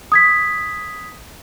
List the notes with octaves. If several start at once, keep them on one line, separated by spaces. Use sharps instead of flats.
D#6 G#6 B6